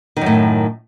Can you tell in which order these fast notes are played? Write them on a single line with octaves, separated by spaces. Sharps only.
D#3 F#2 A2